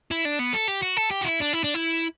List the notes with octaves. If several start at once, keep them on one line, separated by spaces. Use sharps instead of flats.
E4
D4
B3
A4
G4
F#4
A4
G4
F#4
E4
D4
E4
D4
E4